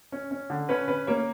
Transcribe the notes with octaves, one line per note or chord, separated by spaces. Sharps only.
C#4
C#4
D3
C#4 B4
C#4 B4
A#3 C#5